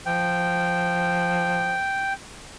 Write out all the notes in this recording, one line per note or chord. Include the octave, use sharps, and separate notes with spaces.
F3 G5